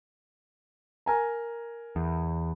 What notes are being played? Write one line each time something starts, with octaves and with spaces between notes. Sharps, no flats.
A#4 G#5 A#5
E2